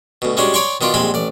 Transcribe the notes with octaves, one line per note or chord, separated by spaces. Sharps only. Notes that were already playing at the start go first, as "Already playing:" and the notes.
D2 B2
G3 G#3 C#4 D4 F#4
C#5 D5 G5 A#5 C6 C#6
B2 D#3 B3 F4 D5
A#1 G3 G#3 C4 B5
A1 D5